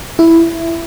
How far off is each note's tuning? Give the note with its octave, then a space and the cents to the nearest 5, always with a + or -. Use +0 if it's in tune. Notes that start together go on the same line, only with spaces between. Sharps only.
E4 +5